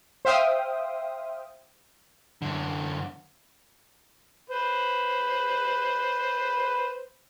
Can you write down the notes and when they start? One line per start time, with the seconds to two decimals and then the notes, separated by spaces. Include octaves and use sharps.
0.25 C5 E5 F5 G5 D#6
2.42 F#2 D3
4.50 B4 C5